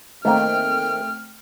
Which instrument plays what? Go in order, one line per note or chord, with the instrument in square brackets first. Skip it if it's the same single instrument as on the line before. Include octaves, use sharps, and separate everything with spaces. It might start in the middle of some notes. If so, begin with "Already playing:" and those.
[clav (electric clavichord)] D#3 A#3 [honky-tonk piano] A3 C4 [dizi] G5 [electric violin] F6